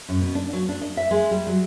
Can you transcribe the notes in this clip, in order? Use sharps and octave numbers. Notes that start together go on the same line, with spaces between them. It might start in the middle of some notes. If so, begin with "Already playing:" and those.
F#2
B2
D4
F#3
D4
D#5
E5
G#3
G3
F#3